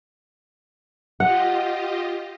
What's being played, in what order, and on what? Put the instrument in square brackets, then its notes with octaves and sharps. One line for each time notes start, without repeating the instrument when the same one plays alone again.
[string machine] F4 G4 D#5 [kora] F#5